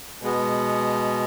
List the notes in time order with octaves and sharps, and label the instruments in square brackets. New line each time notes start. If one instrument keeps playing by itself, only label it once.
[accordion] B2 G#3 B3